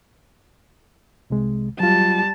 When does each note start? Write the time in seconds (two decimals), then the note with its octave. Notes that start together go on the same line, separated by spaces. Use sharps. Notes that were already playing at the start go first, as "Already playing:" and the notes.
1.30 C2 C3 G#3
1.80 F#3 G3 F4 A5